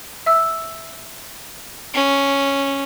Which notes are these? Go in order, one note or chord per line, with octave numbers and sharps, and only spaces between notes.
E5 E6
C#4